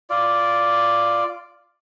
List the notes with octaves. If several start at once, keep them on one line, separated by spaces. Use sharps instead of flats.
F4 D5